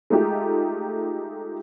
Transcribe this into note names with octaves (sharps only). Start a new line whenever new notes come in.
G#3 A3 D#4 F4 G4